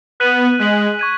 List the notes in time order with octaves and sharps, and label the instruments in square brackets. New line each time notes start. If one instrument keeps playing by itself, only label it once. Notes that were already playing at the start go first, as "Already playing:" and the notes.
[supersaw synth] B3 [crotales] F#6 B6 D#7 F#7
[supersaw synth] G#3 [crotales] F#6 B6 D#7 F#7
[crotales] C#6 G#6 D#7